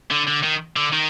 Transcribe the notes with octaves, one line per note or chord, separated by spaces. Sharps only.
D3
D3
D#3
D3
D#3